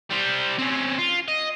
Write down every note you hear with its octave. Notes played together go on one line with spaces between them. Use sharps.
G3 C5
C4 C#4
F4
D#5